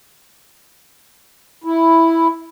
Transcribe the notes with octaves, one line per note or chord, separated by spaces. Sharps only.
E4